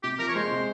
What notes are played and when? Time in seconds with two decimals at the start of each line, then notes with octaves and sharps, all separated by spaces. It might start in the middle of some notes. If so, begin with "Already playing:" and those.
0.03 C3 G4
0.19 F3 A#4
0.28 C#5
0.35 G#3 C5
0.51 C3